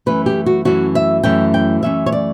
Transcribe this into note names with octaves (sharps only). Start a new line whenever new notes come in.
F#2 E3 A3 C#4 B4
G4
F#4
F#2 E3 A3 C#4 F#4
E5
F#2 E3 A3 C#4 G5
G5
F#2 E3 A3 C#4 E5
C#5
D5